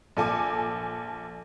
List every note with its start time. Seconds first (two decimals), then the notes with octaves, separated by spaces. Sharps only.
0.17 A#1 A4 G#5 D6